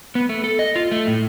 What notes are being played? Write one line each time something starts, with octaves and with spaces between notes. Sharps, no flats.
B3
A3
A4
D#5
F4
A3
A2